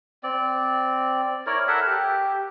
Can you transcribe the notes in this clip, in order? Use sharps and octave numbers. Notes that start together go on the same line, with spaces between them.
C4 D5
E4 A#4 C#5 D5
A4 A#4 E5 F#5
G4